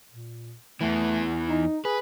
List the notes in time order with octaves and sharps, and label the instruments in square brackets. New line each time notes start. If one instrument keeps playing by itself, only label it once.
[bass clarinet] A#2
[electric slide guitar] E2 E3 [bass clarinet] A3
[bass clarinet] D#4
[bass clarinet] G#4 [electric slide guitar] B4